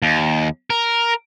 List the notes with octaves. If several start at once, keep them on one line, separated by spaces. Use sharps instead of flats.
D#2
A#4